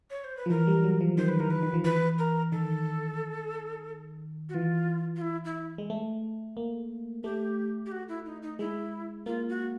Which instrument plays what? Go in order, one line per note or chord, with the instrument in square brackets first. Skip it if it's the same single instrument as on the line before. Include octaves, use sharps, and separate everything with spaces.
[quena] C#5
C5
B4
[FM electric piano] F3
[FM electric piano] E3 [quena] A#4
[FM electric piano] G3
F#3
F3
[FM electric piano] D#3 [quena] C5
[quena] B4
[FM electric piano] E3 [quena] A#4
[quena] B4
[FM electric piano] D#3
F3
[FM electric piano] E3 [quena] B4
[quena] A#4
[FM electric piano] D#3 [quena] A4
[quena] F#4
[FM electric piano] E3 [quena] F4
[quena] F4
E4
E4
[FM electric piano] G#3
A3
A#3
[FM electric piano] A3 [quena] G4
[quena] G4
F#4
E4
D#4
D#4
[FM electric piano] G#3 [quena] E4
[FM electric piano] A#3 [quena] F4
[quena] F#4